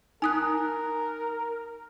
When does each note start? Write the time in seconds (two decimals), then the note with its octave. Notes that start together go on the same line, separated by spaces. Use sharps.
0.22 D#4 A#4 G#5 D#6 F#6